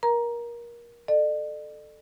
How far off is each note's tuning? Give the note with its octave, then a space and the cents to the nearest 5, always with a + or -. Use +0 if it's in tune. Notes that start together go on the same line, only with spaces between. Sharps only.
A#4 +25 A#5 +10
A4 +0 D5 +45